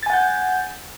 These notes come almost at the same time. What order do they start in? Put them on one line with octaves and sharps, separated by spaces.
A6 G#5 F#5 G6